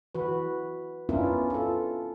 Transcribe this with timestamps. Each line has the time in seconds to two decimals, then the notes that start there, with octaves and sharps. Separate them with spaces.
0.15 E3 F#4 B4
1.09 B3 C#4 D4 E4 F4 A#4
1.50 F4 A4